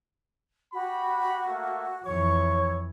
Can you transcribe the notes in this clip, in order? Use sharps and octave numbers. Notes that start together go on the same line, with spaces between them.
F#4 G4 B5
A3 A#3
F2 E3 C#5 C#6